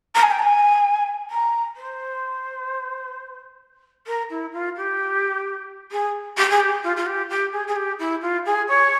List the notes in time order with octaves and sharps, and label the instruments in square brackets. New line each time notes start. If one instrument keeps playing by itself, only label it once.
[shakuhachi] A#5
G#5
G5
A#5
G#5
A#5
C5
A#4
E4
F4
G4
G#4
G4
G#4
G4
F4
F4
G4
G4
G#4
G#4
G4
E4
F4
G#4
C#5